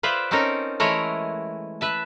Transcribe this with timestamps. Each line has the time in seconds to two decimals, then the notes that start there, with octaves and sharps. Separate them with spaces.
0.03 F4 B4 C5 D5 E5
0.31 C4 C#4 D#4 A4 A#4
0.80 E3 G#3 A3 E4 A#4 C#5
1.81 B4 E5 A5